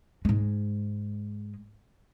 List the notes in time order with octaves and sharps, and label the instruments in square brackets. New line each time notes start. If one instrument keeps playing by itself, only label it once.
[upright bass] G#2 G#3